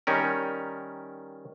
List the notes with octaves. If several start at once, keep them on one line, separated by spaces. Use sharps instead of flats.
D#3 G3 C#4 A#4